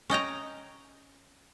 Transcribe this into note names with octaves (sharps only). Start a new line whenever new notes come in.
C#4 D#5 G5 A#5